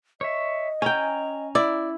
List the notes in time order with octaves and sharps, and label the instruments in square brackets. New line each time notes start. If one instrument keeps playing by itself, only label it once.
[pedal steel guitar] C#5 E5 [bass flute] D#5
[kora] C#4 G5 [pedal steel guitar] G#5 A#5
[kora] E4 [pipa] D5